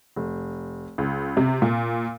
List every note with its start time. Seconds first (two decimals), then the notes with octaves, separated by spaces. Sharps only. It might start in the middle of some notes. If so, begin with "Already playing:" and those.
0.16 F1
0.98 C#2
1.37 C3
1.62 A#2